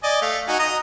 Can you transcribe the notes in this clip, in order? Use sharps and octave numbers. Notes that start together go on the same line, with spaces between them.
D5 D#5 G#5
A3 F5
D#4 F#4 G#5
D#5 A#5 D#6